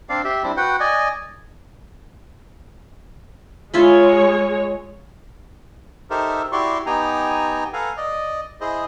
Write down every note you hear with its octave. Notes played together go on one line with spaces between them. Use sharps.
C4 D4 D5 F5
G4 E5
G3 C4 D4 E4
F#4 B4 F#5 G5
D5 D#5 G#5
G#3 F4 C#5 E5 B5
D#4 G4 A4 A#4 C5 E5
E4 F#4 G4 D5 C6 C#6
B3 D#4 G4 G5 G#5 A#5
A4 B4 F5 F#5 G#5 A#5
D5 D#5
E4 G#4 C5 D#5